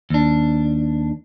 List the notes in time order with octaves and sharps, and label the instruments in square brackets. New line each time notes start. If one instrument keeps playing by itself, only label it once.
[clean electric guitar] D#2 D4